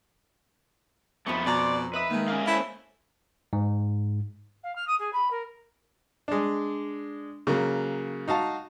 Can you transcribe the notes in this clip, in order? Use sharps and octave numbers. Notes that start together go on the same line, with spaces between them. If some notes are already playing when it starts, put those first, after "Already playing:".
F2 A3 B3 D#4 C#6
B2 D5 A#5 C6
B4 D#5 E5 D#6
D#3 G#3 A#3
C#4 A#4 F5
C#4 E4 A4 B4 C5
G#2
F5
F6
D#6
G#4
B5
A#4
G#3 D4
C#3 F#3 A#3
D#4 F#4 F5 A5